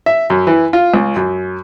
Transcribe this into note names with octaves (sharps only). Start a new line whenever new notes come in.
E5
F#2
E3
F4
C#2
F#2